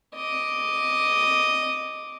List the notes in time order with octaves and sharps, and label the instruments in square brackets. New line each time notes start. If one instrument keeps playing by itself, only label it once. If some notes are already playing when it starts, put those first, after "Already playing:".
[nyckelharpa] D#5 D6